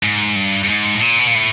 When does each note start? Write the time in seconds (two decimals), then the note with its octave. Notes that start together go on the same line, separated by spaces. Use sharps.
0.03 G#2
0.36 G2
0.63 G2
0.69 G#2
0.95 A2
1.02 A#2
1.19 B2
1.27 A#2
1.35 A2